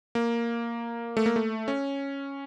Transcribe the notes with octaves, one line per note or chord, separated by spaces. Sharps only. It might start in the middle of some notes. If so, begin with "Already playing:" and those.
A#3
A3
A#3
A3
C#4